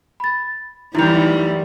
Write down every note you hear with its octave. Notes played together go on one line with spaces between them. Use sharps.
B5 A6
F#2 D#3 E3 G3 A3 D#4 E4 F7